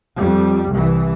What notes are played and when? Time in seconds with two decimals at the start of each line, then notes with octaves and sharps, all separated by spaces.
0.18 F2 G3
0.71 C2 E3